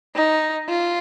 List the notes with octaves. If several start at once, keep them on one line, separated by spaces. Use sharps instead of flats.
D#4
F4